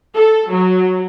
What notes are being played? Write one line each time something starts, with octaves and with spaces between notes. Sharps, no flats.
A4
F#3